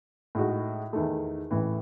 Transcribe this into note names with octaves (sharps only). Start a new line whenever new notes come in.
A2 G#3 D#4 F#4
E2 D#3 A3
A1 A2 E3